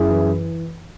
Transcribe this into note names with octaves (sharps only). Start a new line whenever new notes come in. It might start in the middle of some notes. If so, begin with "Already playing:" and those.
Already playing: F#2 E4 G#4
E3